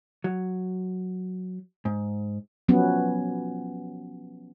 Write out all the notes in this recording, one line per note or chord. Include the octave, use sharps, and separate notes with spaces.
F#3
G#2
F3 F#3 B3 C#4